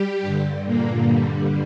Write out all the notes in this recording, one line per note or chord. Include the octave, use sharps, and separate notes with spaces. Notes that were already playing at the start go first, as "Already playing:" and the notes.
Already playing: G3 G4
G2 D3
A#2 A#3
G2 D3 G3